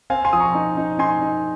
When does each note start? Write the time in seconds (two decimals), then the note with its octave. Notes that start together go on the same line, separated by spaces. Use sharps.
0.10 C4 F5 G#5
0.25 G#5 C6
0.33 F3 D#6
0.40 A#5 C#6
0.55 D#4
0.77 D#4
0.99 D#4 G#5 C6
1.21 D#4